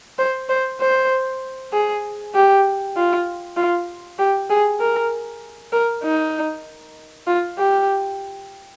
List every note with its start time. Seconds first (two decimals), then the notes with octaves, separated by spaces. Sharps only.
0.18 C5
0.49 C5
0.80 C5
1.73 G#4
2.34 G4
2.96 F4
3.56 F4
4.18 G4
4.49 G#4
4.80 A#4
5.72 A#4
6.03 D#4
7.27 F4
7.57 G4